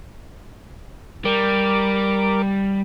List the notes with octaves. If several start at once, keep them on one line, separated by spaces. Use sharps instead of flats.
G3 A#4 D6